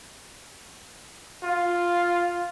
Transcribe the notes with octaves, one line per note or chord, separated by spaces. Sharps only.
F4